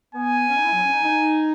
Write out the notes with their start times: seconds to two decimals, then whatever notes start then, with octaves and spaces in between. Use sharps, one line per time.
0.14 B3 G#5
0.47 C#4
0.56 D#4
0.65 E4
0.72 F#3
0.82 C#4
0.92 D#4
1.03 D#4